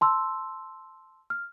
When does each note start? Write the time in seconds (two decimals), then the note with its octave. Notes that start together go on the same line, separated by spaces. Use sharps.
0.01 A5 C6 E6
1.30 F6